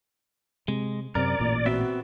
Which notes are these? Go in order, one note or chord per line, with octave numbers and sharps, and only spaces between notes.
C3 G#3
F#2 C3 C4 A#4 D5
A1 A#2
B3 C4 F#4 E5